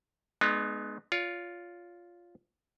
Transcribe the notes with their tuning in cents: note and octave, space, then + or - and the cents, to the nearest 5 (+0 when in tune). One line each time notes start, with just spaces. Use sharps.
G#3 +25 B3 +0 D#4 -40
F4 +0 C#5 +40